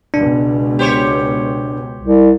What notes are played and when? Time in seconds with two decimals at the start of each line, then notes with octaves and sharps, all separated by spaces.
0.14 C#2 B2 D4
0.79 G4 C5 C#5
2.01 C2